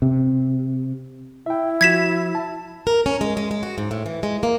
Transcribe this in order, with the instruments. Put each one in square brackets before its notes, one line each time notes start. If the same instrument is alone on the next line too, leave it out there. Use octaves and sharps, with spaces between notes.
[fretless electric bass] C3
[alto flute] E4 [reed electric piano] E5 G5
[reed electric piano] F3 F#4 [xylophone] G#6 B6 E7
[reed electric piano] A5
[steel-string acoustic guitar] A#4
C#4
G#3
G#3
G#3
F#4
G#2
A2
E3
G#3
A#3